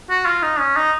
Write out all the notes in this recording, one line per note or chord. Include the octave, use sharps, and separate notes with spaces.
F#4
F4
D#4
C#4
D#4